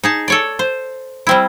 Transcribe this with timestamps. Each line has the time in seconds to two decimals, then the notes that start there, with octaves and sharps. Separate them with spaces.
0.04 D#4 G#4 A5
0.28 A4 C#5 D5
0.59 C5
1.27 G3 C4 E4